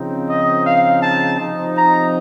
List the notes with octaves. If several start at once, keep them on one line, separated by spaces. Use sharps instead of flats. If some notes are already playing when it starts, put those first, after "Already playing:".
Already playing: C#3 F3 C4 D#4
D#5
F5
A5
C3 F3 C4 D#4
A#5